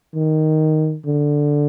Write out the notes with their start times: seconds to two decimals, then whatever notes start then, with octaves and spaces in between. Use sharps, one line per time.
0.15 D#3
1.06 D3